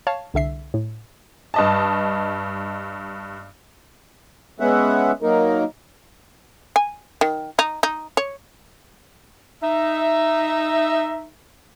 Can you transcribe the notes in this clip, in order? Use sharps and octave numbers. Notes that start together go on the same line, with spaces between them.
C#5 F5 A5
C2 D3 E5 C7
A2
G2 D#5 A5
G#3 B3 C#4 E5 F#5
F#3 A#3 D#4 A#4
G#5
D#3
D#4
D#4
C#5
D#4 E5